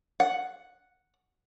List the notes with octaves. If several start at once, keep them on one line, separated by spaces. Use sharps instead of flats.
F#5